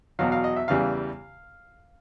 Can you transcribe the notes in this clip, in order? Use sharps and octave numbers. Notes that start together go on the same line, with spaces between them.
E2 B2 F#3 F5
F5
D#5
E5
E2 C#3 E3 G3 F5